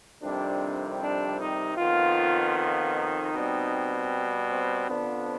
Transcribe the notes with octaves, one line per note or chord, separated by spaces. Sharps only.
F2 C3 D#3 G3 D4
D4
D#4
F2 D#3 B3 F4
F4
D#4
B2 G3 C4
C4
F2 D3 F3 B3 D4